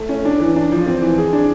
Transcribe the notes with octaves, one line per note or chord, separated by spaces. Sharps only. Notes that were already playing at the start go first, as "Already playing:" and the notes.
Already playing: A3
C#4
D4
E3
D4
F3
C4
E3
G#4
D4